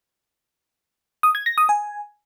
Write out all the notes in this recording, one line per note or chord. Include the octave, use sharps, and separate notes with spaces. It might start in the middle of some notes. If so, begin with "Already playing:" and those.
D#6
G#6
A#6
D#6
G#5